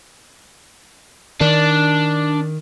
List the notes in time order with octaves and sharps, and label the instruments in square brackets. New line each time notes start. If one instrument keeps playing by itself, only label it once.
[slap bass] D#3 [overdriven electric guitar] D4